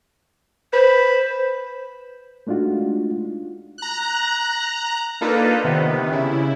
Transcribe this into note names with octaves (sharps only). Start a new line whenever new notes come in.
B4 C5
G#3 A3 D4 D#4 F4 F#4
A#5 F#6
A#3 D4 D#4 F4 A4 B4
C3 D#3 B3
C#3 E4